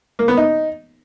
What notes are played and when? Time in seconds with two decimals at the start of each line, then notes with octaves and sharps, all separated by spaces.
0.19 A#3
0.28 B3
0.37 D#4